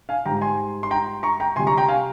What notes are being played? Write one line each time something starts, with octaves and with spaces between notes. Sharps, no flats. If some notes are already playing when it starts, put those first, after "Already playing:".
F5 G#5
G#2 G3 G5 A#5
G#5 C6
C6
G5 A#5
A#5 C#6
G5 A#5
C3 G3 G#5 C6
A#5 C#6
G5 A#5
F5 G#5